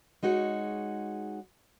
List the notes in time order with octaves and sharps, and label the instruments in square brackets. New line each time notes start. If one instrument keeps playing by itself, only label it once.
[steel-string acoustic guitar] G#3 D#4 F#4 C#5